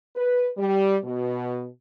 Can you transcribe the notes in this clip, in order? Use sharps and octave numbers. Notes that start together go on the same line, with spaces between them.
B4
G3
B2